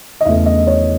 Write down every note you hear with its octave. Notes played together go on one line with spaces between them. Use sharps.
D#5
E2 C#3 E3 A3 E5
D#5
C#5